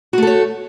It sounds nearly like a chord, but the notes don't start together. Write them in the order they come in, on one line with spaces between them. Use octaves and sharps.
F#4 A3 A4 C#5